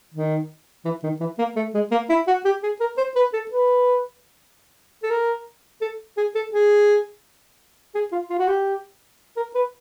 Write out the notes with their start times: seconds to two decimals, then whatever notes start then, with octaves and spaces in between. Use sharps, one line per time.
0.14 D#3
0.85 E3
1.03 D#3
1.20 E3
1.38 A#3
1.56 A3
1.74 G#3
1.91 A#3
2.10 E4
2.27 F#4
2.45 G4
2.63 G#4
2.80 A#4
2.98 C5
3.16 B4
3.33 A4
3.51 B4
5.03 A4
5.11 A#4
5.81 A4
6.17 G#4
6.35 A4
6.53 G#4
7.95 G#4
8.12 F4
8.30 F4
8.39 F#4
8.48 G4
9.37 A#4
9.55 B4